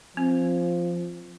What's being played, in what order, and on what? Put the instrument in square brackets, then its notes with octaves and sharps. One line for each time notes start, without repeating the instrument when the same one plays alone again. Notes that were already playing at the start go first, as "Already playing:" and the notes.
[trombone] F3 [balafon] C4